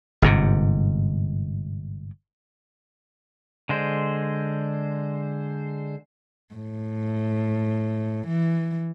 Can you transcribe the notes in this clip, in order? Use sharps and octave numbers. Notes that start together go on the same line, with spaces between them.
G1 G#2 C3
D3 G#3 C5
A2
E3